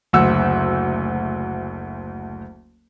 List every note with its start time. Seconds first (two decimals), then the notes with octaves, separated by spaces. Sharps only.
0.13 F#1 D2 F#5 E6